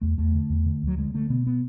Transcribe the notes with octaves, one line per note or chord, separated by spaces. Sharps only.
E2 A3
E2 A3
D3
E2
D3
D2 F#3
D3 G#3
D3 A3
B2 B3
B3